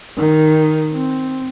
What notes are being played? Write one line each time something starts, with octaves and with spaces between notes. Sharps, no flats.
D#3
C4